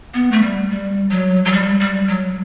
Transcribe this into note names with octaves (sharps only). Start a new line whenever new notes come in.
B3
A3
G3
G3
F#3
F#3
G3
G3
F#3